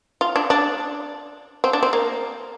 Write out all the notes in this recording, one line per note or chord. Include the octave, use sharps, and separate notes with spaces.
F4
D4
D4
C4
D4
C4
A#3